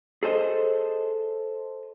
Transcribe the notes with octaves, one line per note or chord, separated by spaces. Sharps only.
G#4 A4 C5 D#5